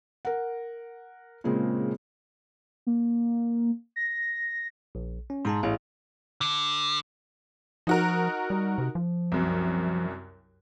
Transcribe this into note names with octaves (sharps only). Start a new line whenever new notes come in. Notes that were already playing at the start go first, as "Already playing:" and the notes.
A#4 F#5
A#2 C#3 G#3 A#3 C4
A#3
A#6
A#1
C#4
G#2 A5 A#5 C6
A1 E4 G#4 F5
D3
F3 D#4 F#4 A#4
G3
C3
F3
C2 F#2